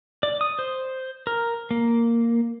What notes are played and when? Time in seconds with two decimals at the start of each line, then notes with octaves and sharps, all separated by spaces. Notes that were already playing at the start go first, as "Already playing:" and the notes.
0.23 D5
0.41 D#6
0.59 C5
1.27 A#4
1.71 A#3